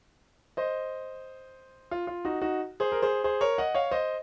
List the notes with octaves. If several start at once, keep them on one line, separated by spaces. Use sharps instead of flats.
C5 D#5
F4
F4
D#4 F#4
D#4 F#4
G#4 C5
A#4
G#4 C5
G#4 C5
A#4 C#5
D#5 F#5
C#5 F5
C5 D#5